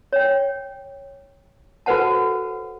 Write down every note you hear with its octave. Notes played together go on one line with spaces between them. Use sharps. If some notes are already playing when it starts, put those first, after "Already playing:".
C#5 G5
F#4 A4 B4 C5 F#5 A5